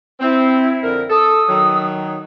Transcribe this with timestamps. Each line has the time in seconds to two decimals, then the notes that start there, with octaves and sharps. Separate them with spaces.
0.20 C4 E4
0.83 F2 D3 A#4
1.10 A4 D#6 E6
1.49 D#3 F#3